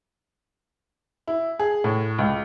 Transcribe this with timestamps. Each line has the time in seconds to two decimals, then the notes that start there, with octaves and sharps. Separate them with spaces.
1.28 E4
1.59 G#4
1.84 A2
2.18 C#2